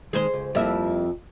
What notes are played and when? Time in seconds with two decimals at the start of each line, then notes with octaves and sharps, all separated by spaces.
0.13 D#3 G#3 G#4 C5
0.34 C#2
0.55 F2 G3 A#3 E4 E5